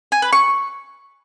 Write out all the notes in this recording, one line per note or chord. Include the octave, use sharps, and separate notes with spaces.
G#5
B4
C#6